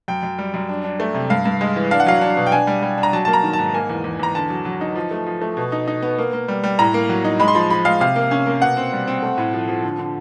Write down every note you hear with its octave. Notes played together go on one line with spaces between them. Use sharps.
F#2 G5
F#2
G3
F#2
D4
D4
A3
C3
G2 F5
G2
G#3
E3
D4 F5
F#5
F#3 F5
D4
B2
G5
D4 G#5
G3
G3
D4
A#5
F#3 A5
A#3 A5
A#5
D#3
A5
G#2
A#3 G#5
E2
E2
E2 A#5
D3 A5
F#3
F#3
D#4
F3
A3
F3
A3
B2
D#4
D#4
B3
A#3
A#3
G3
G3
A2 A#5
A#3
F#3
D#4
G#3 B5
C6
F3 B5
F3 B5
G#3 F5
C3 F5
A#3
C#4
A#3
B2 F#5
C4
G3
C4
A3
A2
F3
F3
D3
D3